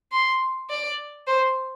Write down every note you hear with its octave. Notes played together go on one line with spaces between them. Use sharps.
C6
D5
C5